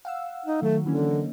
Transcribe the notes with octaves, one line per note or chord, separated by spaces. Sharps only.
F5 F#5 E6
D#4
D#3 F#3 A3
D3 E3 A#3 C#4
D#4